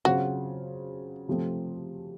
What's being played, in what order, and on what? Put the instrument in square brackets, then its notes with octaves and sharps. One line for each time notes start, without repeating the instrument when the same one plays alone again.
[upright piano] C#3 F#3 C4 F4 C5 [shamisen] F#4
[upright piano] C3 F3 A3 C4